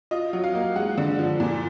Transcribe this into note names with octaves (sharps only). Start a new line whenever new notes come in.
F4 D#5
F#3
F5
A#3
G#3 F#5
D3
F3
A#2